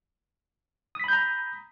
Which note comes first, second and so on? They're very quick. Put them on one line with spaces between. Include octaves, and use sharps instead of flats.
D#6 B6 B5 G6 A#5